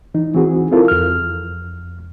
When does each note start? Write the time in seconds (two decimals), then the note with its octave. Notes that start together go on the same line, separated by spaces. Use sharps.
0.14 E3 D#4
0.34 E3 C4 F#4 G#4
0.72 C4 E4 F4 A4 A#4
0.88 F2 F6